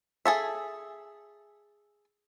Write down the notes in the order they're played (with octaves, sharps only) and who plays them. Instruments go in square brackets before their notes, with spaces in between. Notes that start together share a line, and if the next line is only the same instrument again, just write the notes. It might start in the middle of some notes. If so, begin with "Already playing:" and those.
[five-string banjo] G#4 A4 E5